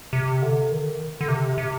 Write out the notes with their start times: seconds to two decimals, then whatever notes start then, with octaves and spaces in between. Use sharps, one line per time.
0.13 C3
0.42 D3
0.71 D#3
1.21 D3
1.28 C3
1.58 C3